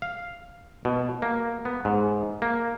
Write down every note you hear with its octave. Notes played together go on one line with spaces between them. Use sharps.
F5
B2
A#3
B3
G#2
A#3